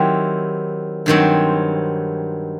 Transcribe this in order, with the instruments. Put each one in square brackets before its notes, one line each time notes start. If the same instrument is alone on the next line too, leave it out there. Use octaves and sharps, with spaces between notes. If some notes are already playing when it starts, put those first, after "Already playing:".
Already playing: [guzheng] D#3 F#3 C4 E4 G4
G2 D#3 F#3 C4